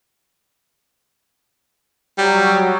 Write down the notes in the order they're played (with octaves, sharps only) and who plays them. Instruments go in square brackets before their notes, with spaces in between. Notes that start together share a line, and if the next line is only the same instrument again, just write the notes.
[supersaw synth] F#3 [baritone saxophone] G3